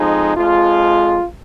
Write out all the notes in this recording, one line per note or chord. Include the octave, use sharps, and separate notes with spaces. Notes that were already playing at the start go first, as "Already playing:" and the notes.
Already playing: F2 F3 G#3 D#4
F2 F3 G#3 F4